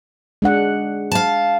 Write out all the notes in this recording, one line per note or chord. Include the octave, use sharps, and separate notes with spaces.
G#3 D4 F#5
F5 A5